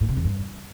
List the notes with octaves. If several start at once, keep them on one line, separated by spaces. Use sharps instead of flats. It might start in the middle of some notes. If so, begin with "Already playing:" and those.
A2
C3
E2
G2